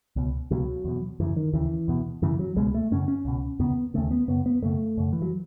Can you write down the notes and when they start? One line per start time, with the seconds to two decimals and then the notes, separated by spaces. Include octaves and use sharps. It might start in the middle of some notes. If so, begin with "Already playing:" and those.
0.16 C#2 B2
0.51 C#2 B2 F#3
0.84 E2 B2
1.20 F#2 C#3 E3
1.36 D#3
1.53 D#2 C#3 E3
1.88 E2 B2
2.22 F#2 C#3 E3
2.39 F#3
2.56 C#2 B2 G#3
2.74 A3
2.91 F#2 C#3 C#4
3.08 C#4
3.25 C#2 B2
3.59 E2 C#3 B3
3.94 D#2 C#3 A3
4.11 B3
4.28 F#2 C#3 B3
4.46 B3
4.62 F#2 C#3 A3
4.97 F#2 C#3
5.13 E3
5.22 F#3